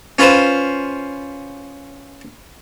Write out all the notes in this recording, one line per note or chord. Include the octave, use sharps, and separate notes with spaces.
C#4 F4 B4 C5